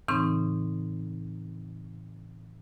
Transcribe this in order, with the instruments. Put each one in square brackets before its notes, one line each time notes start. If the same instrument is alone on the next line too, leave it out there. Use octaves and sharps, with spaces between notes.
[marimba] A2 C#3 E3 C4 D#4 C#6